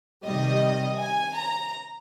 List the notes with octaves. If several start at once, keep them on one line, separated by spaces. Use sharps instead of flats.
C3 D#3 G3 D#5
G#5
A#5